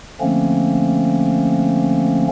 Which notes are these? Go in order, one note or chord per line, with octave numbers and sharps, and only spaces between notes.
D3 F3 A3 A#3 C4 C#4